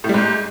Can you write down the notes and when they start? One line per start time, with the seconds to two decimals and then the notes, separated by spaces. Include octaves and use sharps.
0.04 A2
0.09 G3
0.14 G#2